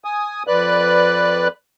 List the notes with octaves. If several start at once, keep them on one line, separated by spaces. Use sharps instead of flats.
G#5 D#6
F2 B4 D5 F#6